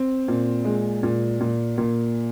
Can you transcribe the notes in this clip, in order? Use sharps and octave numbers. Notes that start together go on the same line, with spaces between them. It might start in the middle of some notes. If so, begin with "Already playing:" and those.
Already playing: C4
A#2
G#3
A#2
A#2
A#2